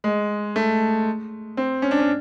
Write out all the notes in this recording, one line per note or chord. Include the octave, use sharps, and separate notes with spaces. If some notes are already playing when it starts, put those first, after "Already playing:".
G#3
A3
C4
C#4
D4
C#4